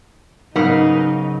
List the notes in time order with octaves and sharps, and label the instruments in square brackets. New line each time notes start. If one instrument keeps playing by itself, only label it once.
[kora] G#2 F5 [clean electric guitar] C#3 F#3 [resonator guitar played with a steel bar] B3 A#4 [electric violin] D#4